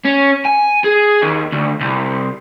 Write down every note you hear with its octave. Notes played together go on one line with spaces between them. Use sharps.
C#4
G#5
G#4
D#2
D2
C2